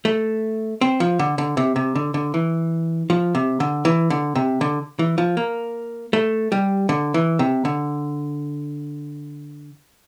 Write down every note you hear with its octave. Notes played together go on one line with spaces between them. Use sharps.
A3
C4
F3
D3
D3
C3
C3
D3
D3
E3
F3
C3
D3
E3
D3
C3
D3
E3
F3
A#3
A3
G3
D3
E3
C3
D3